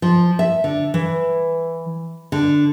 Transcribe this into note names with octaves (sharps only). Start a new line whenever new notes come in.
F3
E5
D3
E3
D3